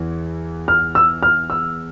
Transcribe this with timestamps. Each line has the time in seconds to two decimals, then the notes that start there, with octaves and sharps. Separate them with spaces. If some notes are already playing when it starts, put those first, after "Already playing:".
Already playing: E2 E3
0.68 F6
0.95 E6
1.23 F6
1.50 E6